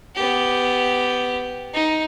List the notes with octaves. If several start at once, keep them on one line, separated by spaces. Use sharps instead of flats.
B3 G4
D#4